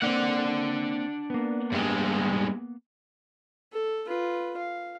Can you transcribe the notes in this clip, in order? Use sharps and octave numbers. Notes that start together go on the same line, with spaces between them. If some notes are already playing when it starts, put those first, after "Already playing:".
A#3 C4 D4 F#5
A#3 B3
G2 G#3
A4
F4 B4
F5